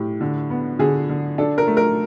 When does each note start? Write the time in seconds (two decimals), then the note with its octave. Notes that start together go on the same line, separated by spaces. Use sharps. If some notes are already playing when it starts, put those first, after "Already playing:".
Already playing: A2 G4
0.21 D3
0.50 B3
0.79 D3 G#4
1.09 D3
1.38 D4 A4
1.58 A#4
1.67 A3
1.77 A#4